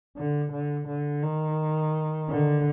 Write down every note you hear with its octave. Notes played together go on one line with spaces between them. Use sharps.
D3
D3
D3
D#3
D3